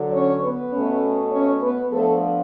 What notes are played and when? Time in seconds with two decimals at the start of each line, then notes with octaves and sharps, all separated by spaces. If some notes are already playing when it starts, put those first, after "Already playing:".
Already playing: D3 F#3
0.12 C#4 C#5
0.43 B3 B4
0.72 B2 A3 C#4
1.32 C#4 C#5
1.62 B3 B4
1.92 F3 A3 B3 D4 A4